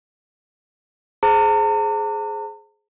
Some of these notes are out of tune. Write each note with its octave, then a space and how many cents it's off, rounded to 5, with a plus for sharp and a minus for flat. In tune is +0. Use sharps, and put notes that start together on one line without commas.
G#4 +15 C5 +0 A#5 -45